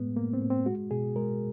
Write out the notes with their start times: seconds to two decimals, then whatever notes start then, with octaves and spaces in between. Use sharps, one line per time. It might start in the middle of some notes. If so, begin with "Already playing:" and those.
Already playing: A2 G#3 B3
0.16 A2 A#3
0.33 C4
0.41 A2
0.50 C4
0.66 G#3 F#4
0.91 B2 G#4
1.16 G#3 A#4